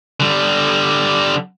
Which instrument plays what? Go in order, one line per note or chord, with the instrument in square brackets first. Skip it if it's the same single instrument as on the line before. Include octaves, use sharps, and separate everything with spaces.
[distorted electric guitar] D3 G3